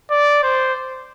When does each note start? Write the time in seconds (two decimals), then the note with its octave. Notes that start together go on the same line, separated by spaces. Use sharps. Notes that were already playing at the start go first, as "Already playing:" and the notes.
0.11 D5
0.43 C5